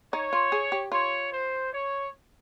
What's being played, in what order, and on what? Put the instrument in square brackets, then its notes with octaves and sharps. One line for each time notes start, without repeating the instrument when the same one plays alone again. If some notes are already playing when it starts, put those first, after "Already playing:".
[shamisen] D#4 [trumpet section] C#5
[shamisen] F4
G#4
G4
[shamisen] F4 [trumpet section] C#5
[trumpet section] C5
C#5